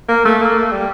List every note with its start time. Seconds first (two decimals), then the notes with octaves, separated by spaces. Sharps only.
0.09 A#3
0.25 A3
0.41 A#3
0.57 A3
0.72 G3